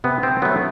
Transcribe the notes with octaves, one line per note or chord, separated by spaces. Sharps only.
C3 B3
C4
F#3 A3 B3